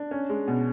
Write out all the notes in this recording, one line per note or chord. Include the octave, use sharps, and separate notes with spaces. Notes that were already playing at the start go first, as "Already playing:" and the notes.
Already playing: D4
C#4
G#3
B2